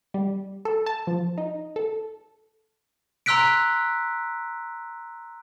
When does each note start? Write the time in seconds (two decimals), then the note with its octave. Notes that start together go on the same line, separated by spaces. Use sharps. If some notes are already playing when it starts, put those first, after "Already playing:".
0.14 G3
0.65 A4
0.86 A5
1.07 F3
1.38 D#4
1.76 A4
3.26 A#5 C6 E6 F#6 B6 D7